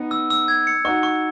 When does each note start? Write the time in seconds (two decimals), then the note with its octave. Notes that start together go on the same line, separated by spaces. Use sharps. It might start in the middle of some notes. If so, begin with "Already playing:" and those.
Already playing: B3 D#4
0.11 E6
0.30 E6
0.48 G#6
0.67 C#7
0.85 D#4 F#4 C#6
1.03 C#6